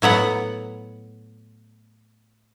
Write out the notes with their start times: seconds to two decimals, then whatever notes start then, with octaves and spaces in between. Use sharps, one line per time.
0.02 A2 F#3 B3 F#5